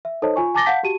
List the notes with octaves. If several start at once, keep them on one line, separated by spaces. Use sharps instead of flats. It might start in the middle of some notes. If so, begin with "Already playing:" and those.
E5
D#4 A4 C5 C#5 D#5 A5
F4 G#5 C#6
G#5 A5 D6 A6 A#6 G7
F5 F#5 A5 G6 B6
F#4 G4 A5 D#7